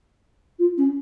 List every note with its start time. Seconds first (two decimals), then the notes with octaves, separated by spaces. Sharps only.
0.59 F4
0.77 C#4